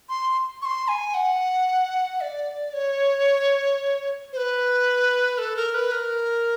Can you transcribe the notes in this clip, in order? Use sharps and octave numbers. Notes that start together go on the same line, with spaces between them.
C6
C#6
C6
G#5
F#5
D5
C#5
C5
B4
A4
A#4
B4
A#4